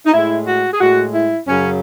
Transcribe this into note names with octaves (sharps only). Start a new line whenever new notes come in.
D#4
A2 G#3 E4
F#4
G#4
A2 G#3 F#4
E4
F#2 C#3 F#3 C#4